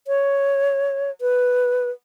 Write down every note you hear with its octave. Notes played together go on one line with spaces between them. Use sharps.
C#5
B4